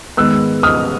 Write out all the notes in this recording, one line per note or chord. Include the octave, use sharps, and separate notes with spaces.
G#2 D#3 G#3 B3 E6 F#6
D#6 F6